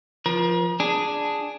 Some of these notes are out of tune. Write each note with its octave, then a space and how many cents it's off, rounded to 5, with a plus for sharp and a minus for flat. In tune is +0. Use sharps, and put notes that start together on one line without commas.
F3 -5 A#4 +40
D4 +0 G#4 +0